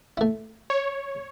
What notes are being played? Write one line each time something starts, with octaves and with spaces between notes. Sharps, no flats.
A3 E4
C#5